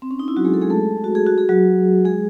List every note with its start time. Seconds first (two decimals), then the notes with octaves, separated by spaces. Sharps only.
0.02 C4
0.11 C#4
0.19 D#4
0.28 E4
0.37 F#3 F#4
0.45 G#3 G#4
0.54 A4
0.62 G#3 G#4
0.70 A3 A4
1.04 F#4
1.15 G#4
1.27 F#4
1.38 G#4
1.49 F#3 F#4
2.05 G#3 G#4